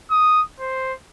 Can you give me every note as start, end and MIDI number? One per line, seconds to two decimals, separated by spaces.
0.11 0.43 87
0.60 0.93 72